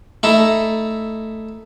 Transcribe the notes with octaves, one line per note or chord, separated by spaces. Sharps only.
A3 D#4 E4